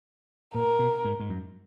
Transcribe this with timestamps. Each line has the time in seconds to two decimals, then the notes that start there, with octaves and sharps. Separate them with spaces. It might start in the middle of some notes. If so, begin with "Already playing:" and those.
0.54 A#2 A#4
0.79 B2
1.05 G#2
1.20 G#2
1.29 F#2